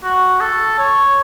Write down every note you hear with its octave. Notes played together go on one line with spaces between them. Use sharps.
F#4
A4
C#5